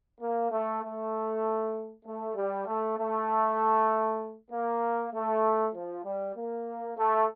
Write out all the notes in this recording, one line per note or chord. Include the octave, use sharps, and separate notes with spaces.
A#3
A3
A3
A3
G3
A3
A3
A#3
A3
F3
G3
A#3
A3